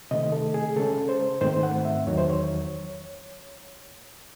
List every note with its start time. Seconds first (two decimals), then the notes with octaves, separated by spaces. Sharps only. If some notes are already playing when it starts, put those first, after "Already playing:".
0.11 C3 D#3 A3 D#5
0.32 A4
0.54 G#4
0.76 C#3 G#3 C#4 A4
1.09 C5
1.41 G#2 D#3 A3 C4 C5
1.63 F#5
1.85 E5
2.06 E2 D#3 F#3 C#5
2.18 C5
2.30 C#5